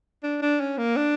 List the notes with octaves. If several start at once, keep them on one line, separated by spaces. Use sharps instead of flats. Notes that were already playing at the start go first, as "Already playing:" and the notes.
D4
D4
C#4
A#3
D4